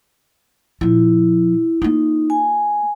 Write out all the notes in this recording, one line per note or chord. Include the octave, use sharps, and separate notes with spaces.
A#2 F3 E4
A#3 D#4 F4
G#5